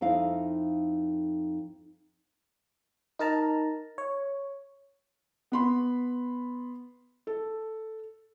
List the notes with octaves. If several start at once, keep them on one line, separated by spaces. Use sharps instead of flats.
F2 D#4 E4 F5
D#4 A#4 A5 A#5
C#5
B3 B5 C6
A4